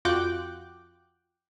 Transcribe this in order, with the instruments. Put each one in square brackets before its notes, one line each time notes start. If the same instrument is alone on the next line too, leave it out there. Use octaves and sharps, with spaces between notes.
[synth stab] F2 F4 F#4 G5 D6 F#6